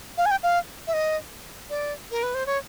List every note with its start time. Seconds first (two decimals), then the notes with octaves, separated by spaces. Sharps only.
0.18 F5
0.26 G#5
0.31 G5
0.43 F5
0.87 E5
0.93 D#5
1.70 D5
2.11 A#4
2.23 B4
2.34 C5
2.46 C#5